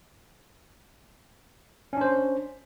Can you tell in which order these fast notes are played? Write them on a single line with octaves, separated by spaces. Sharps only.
C#4 D4 C5